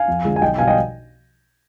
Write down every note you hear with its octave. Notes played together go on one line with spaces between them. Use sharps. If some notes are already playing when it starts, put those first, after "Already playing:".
Already playing: F5 G#5
F2
D3 F3 G#3
G#5
B1 D#5 G5
B2 G3 D#5 F5 G5 G#5